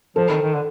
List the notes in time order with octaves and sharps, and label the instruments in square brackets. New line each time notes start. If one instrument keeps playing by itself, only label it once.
[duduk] F3 [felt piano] A4
[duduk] D#3
D#3
D3